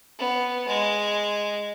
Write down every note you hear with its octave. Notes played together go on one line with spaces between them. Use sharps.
B3
G#3